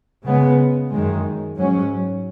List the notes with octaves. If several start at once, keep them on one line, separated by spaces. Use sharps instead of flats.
C#3 G#3 B3
F#2 D#3 G#3
G#2 F#3 C#4